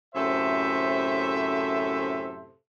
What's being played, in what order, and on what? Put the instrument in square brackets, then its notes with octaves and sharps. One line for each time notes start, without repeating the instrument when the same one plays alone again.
[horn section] F#2 A2 C3 A4 C5 E5